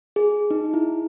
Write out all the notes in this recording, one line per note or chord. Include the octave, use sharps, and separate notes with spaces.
G#4
D#4
E4